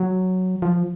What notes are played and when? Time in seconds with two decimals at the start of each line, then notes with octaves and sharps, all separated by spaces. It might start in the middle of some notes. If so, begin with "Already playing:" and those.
Already playing: F#3
0.62 F3